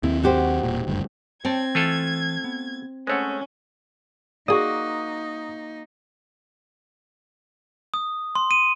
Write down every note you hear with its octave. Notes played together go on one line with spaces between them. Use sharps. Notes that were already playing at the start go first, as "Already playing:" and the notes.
D#2 C4 E4
F#4 G4 C5
E1 A#2
F#1 D2 G2
C4 C#5 G5 A5 G#6
E3 A3 F4 A4
B3
G#3 A3 C#4 C5 C#5 F#5
A#3 D#4 F#4 G#4 D5 D#6
D#6
C6
D#7